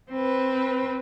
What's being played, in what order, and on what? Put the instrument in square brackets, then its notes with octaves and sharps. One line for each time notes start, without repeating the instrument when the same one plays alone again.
[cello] C4 B4